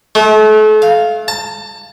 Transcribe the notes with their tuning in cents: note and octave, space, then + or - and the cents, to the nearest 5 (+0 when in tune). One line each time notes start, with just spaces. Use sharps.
A3 -35
F5 -5
A5 +25